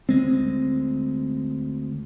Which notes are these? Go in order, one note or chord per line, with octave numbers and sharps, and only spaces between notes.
D2 G#3 C4